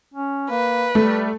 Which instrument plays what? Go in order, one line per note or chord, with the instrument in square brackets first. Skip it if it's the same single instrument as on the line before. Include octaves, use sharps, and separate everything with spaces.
[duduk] C#4
[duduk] A#3 [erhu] B4
[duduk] G3 [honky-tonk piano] A3